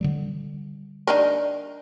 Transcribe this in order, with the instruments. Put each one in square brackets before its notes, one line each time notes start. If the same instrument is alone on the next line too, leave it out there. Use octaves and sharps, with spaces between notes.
[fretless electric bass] D3 F#3 G3
[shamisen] D4 D#4 A#4